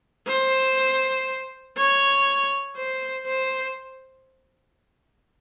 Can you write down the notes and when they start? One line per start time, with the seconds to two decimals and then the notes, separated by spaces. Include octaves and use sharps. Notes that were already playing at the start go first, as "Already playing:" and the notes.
0.27 C5
1.77 C#5
2.76 C5
3.27 C5